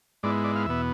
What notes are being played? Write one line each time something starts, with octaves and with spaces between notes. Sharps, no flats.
G#2 G#3 B3 E4 D5
D5
F5
E2 B2 B3 E5